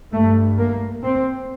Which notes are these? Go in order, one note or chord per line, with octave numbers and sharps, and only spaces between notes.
G2 A3
A#3
C4